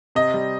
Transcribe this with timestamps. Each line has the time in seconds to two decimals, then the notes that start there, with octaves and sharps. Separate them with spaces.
0.15 C3 D#5
0.34 G3